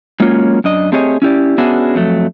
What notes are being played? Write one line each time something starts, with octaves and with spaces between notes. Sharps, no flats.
F#3 G#3 A#3 C#4 F4 C#5
F#2 D4 D#5
A3 C4 G4 G#4 C#5 D#5
C#4 E4 G4 D5
B3 C#4 D4 F#4 G#4 E5
F2 F#3 A3